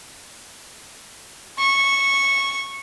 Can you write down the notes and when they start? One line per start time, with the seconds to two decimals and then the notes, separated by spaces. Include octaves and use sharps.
1.59 C#6